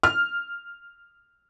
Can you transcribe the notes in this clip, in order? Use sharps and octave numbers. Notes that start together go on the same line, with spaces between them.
F6